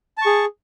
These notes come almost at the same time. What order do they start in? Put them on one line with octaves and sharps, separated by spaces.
A5 C#6 G#4